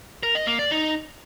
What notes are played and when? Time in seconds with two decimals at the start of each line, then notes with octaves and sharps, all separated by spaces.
0.23 A#4
0.35 D#5
0.47 A#3
0.59 D5
0.71 D#4